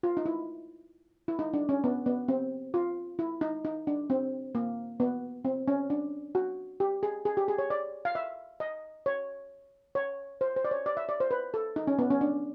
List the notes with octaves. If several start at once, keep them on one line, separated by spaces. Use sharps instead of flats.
F4
D#4
E4
E4
D#4
D4
C#4
B3
B3
C4
F4
E4
D#4
D#4
D4
C4
A#3
B3
C4
C#4
D4
F#4
G4
G#4
G#4
G4
G#4
C#5
D5
F5
E5
D#5
C#5
C#5
C5
C5
D5
C#5
D5
E5
D5
C5
B4
A4
D#4
C#4
B3
C#4
D4